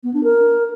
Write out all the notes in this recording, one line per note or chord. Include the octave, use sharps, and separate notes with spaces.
B3
D4
A#4